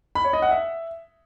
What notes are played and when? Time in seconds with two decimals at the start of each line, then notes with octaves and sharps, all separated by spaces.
0.15 B5
0.24 C#5
0.33 D#5
0.42 F#5
0.51 E5